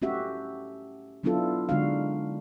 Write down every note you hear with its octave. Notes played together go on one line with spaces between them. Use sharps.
A3 C#4 F#4 G4 E5
F#3 B3 D4 E4 F4 A4
D3 G#3 D4 D#4 F#4 F5